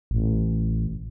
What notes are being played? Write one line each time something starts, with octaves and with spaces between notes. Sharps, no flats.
A1